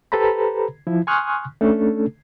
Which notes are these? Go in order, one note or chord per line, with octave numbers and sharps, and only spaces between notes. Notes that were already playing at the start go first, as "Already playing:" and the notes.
G4 A4 B4 C5 A#5 B5
F3 E4
G#5 C6 C#6 D#6 F6 F#6
A3 C#4 D4 A4